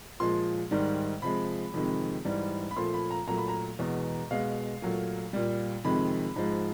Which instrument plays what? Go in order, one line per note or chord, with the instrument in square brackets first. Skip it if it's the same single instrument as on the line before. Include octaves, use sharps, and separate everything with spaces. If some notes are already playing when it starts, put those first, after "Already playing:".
[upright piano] A#2 F3 G#3 C6
G#2 D#3 G3
C3 F3 G#3 B5
F2 C3 D#3 G#3
G#2 E3 G3
B5
A#2 F3 A3 C6
B5
A#5
A#2 F#3 A3 A#5
B5
A#5
E2 B2 G#3
B2 G#3 F5
A#2 F#3 A3
A#2 G3
F2 C3 D#3 G#3 B5
G#2 F3 G#3